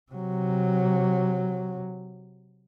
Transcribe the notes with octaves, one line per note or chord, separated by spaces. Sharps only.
C3 F#3